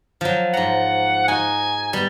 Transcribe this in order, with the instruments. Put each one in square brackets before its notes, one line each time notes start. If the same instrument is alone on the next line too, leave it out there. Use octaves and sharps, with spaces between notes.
[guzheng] F3 F#3
[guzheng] G#2 A#5 [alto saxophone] F#5
[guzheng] D#4 F#4 [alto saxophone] G#5
[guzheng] G3 [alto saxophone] B3